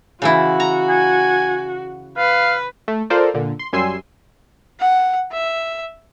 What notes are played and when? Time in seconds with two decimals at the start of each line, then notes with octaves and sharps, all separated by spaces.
0.22 C#3 E3 E4 F#4
0.60 A#5
0.89 G#5
2.18 B4 F5
2.88 A3
3.10 F4 A4 A#4 C5 D5
3.34 A#2 D3
3.59 C6
3.73 F#2 G3 G#5 C6 E6 C7
4.80 F#5
5.32 E5